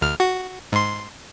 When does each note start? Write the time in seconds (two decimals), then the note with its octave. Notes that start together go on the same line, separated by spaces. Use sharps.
0.01 D2 F6
0.20 F#4
0.72 G#2 C6